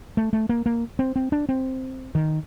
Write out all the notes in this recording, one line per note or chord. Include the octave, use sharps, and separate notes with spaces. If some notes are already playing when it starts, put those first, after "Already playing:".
A3
A3
A#3
A#3
C4
C4
D4
C4
D#3